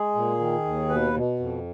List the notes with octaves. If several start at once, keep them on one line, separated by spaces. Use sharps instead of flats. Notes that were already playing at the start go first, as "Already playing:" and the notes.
Already playing: G#3 G#4
A#2
D#3
D#2
B2 B4
B2
F2